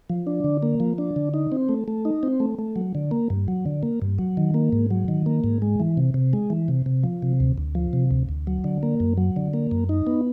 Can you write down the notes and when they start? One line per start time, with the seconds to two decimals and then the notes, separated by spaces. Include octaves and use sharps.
0.10 F3
0.27 D4
0.44 D3
0.63 A#3
0.80 F3
0.98 D4
1.16 D3
1.34 D#4
1.52 C4
1.69 A3
1.88 A3
2.05 D#4
2.23 C4
2.40 A3
2.59 A3
2.76 F#3
2.95 D3
3.11 A#3
3.30 G2
3.48 F#3
3.66 D3
3.83 A#3
4.02 G2
4.19 F#3
4.37 D#3
4.54 A#3
4.72 G#2
4.91 F#3
5.08 D#3
5.26 A#3
5.44 G#2
5.62 G#3
5.80 E3
5.97 C3
6.14 C3
6.33 G#3
6.50 E3
6.68 C3
6.86 C3
7.03 F3
7.22 C3
7.40 D2
7.58 D2
7.75 F3
7.93 C3
8.11 D2
8.29 D2
8.47 F#3
8.64 D3
8.83 A#3
9.00 F#2
9.17 F#3
9.36 D3
9.54 A#3
9.71 F#2
9.89 D#4
10.07 B3